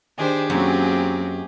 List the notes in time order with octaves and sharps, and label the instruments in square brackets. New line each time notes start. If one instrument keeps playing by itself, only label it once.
[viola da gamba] D#3 D4 C5 [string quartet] G4 G#4
[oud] F#2 [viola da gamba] F#3 A#3 C4